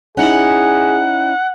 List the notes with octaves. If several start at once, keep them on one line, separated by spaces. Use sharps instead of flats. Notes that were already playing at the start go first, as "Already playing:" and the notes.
C#4 D#4 E4 G#4 F#5